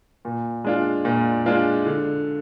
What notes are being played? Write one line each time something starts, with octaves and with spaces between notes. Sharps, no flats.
A#2
G#3 D4 F4
A#2
G#3 D4 F4
D3